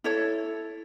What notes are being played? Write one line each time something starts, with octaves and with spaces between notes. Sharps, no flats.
E4 A4 C#5